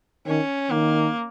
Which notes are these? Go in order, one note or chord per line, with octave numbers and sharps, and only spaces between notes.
D#3 C#4
D#3 A#3